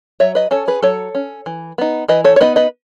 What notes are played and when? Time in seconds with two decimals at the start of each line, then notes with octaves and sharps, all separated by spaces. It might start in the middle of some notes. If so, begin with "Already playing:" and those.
0.20 F#3 C#5 E5
0.35 B4 D#5
0.51 C#4 A4 C#5
0.68 G#4 B4
0.82 F#3 A4 C#5
1.15 C#4
1.46 E3
1.78 B3 D#4
2.08 E3 B4 D#5
2.24 A4 C#5
2.36 C#5
2.41 B3 D#4 B4 D#5
2.56 B4 D#5